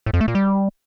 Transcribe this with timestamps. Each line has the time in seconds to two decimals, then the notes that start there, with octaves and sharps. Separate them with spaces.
0.06 A2
0.14 F2
0.21 A3
0.28 A#2
0.35 G3